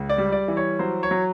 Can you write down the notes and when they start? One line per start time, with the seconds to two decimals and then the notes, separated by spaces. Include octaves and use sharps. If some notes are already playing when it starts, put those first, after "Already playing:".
Already playing: C#2
0.09 D5
0.18 G3
0.32 D5
0.48 E3
0.57 C#5
0.79 F#3 C5
1.03 C#5
1.11 F#3